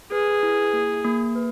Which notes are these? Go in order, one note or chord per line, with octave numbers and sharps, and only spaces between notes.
G#4 B4
E4
A#3
A#3
B4